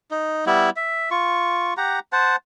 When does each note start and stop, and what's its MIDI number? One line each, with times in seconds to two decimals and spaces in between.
0.11 0.45 63
0.46 0.70 55
0.46 0.70 59
0.46 0.70 64
0.76 1.09 76
1.11 1.74 65
1.11 1.74 85
1.77 1.99 67
1.77 1.99 78
1.77 1.99 82
2.12 2.36 72
2.12 2.36 78
2.12 2.36 81